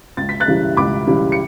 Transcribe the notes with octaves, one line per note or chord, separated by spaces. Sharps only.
C#2 A6
B6
F#6 A6
C#3 E3 G3
C#2 B5 D6
C#3 E3 G3
C#7